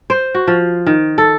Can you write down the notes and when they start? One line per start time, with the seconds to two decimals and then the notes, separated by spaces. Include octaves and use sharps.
0.10 C5
0.35 F#4
0.47 F3
0.86 D#3
1.18 A4